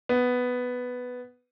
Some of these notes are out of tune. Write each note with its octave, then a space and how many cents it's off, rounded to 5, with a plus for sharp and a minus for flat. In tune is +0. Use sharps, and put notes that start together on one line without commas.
B3 +5